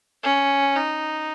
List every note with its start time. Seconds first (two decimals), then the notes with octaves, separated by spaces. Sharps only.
0.23 C#4
0.76 D#4